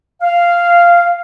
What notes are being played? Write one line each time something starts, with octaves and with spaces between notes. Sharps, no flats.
F5